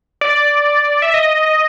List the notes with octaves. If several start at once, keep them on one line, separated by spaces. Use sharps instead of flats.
D5
E5
D#5